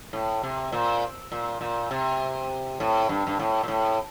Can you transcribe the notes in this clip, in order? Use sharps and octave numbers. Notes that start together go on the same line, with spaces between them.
A2
C3
A#2
A#2
A#2
C3
A2
G2
G2
A2
A#2
A2